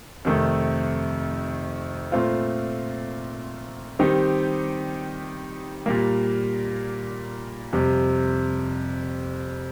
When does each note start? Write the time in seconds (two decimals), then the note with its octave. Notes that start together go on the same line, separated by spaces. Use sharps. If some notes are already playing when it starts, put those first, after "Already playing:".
0.25 F2 C3 D#3 A3
2.12 A#2 A3 C4 F4
3.99 D#3 G3 C4 D#4 G4
5.86 A#2 G3 A#3
7.73 F2 C3 G3